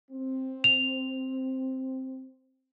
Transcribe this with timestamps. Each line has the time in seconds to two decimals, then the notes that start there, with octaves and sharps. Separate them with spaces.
0.11 C4
0.64 F7